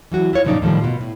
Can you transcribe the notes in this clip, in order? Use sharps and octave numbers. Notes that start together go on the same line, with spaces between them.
E3 F#3 F#4
E4 F4 C#5
F#2 A#2 C#3 F3 D#4 D5
A2 D#3 F3 G3
B2 F4
A2